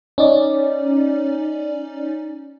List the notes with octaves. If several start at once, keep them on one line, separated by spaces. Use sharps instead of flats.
C#4 D#4 D5